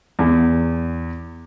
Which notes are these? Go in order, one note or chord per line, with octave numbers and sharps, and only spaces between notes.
E2